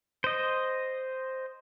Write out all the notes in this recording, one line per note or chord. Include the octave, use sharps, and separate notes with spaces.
C5 D#5